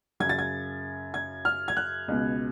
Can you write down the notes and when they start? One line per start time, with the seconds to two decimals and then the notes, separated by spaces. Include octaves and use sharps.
0.20 F#2 C#3 G#6
0.29 A6
0.39 G#6
1.14 G#6
1.45 F6
1.68 G#6
1.77 F#6
2.08 C#2 B2